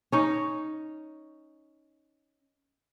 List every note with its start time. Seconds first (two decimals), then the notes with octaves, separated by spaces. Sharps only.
0.12 C#4 D#4